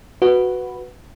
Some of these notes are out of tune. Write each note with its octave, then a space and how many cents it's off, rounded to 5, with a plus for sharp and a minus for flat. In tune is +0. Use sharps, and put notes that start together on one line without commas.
F#4 +0 B4 +0